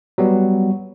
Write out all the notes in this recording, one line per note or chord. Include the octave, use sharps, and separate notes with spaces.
F#3 G3 B3